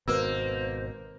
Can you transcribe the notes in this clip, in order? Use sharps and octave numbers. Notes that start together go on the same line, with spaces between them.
G#1 B2 A#3 B4 C5 E6